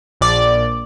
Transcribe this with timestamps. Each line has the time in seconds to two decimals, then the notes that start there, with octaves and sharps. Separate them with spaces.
0.21 A#1 D5